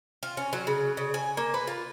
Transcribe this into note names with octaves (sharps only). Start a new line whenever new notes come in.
F4
C#4
F#3
C#3
C#3
G#5
A#3
B4
F4